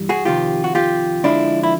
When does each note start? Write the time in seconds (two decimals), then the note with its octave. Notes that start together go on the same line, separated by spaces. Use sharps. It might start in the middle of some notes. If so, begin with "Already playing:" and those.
Already playing: G2 E3 G3
0.09 F#4 G#4
0.25 F2 C3 D#3 F4 G4
0.64 F#4
0.75 F4 G4
1.24 F2 D3 F3 G#3 D4 E4
1.63 E4